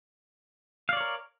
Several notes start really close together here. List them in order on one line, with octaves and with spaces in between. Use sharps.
F5 D5 C#5 A#4